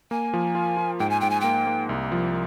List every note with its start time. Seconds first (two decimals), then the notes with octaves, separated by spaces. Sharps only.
0.11 A#3 G#5
0.33 F3
0.55 F4
0.77 F4
0.99 G#2 G5
1.10 G#5
1.21 G#2 G5
1.30 G#5
1.41 A#3 G5
1.67 A#3
1.89 C2
2.12 F3